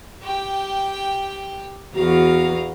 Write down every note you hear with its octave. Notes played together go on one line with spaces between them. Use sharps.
G4 G5
E2 F#4 F5 A#5